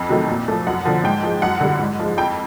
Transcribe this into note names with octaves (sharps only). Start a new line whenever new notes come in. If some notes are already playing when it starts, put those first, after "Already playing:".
Already playing: F2
C3 D#3 F#3 A3
A#2
F3 A3
F#2 F#5
D3 F3
G#2 G5
F3 G#3
F#2 F#5
D3 G3
G#2
F3 G#3
F2 G5